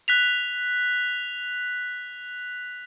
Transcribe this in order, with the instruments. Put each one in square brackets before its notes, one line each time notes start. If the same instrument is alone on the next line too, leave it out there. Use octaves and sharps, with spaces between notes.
[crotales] F#6 B6 F7